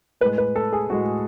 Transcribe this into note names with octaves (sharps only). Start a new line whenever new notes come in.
A2 G#3 B4
B4
A4
G#4
A2 G#3 F#4